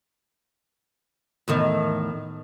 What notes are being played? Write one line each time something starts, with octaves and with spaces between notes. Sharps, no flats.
E2 A2 D#3